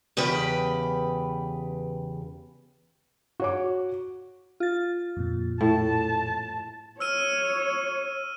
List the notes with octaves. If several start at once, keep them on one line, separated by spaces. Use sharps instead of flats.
E2 C#3 G4 B4
F#4 C#5 D6
F4 A6
F2 A#2
A2 A5
C#5 E6 F6 D#7